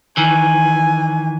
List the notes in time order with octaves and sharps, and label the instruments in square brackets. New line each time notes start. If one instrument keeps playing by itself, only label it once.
[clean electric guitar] D#3 E3 [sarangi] G#5